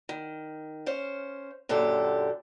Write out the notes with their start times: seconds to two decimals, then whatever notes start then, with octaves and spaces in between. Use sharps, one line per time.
0.09 D#3
0.86 C#4 C5 F5
1.69 F#2 A#2 D3 G4 A4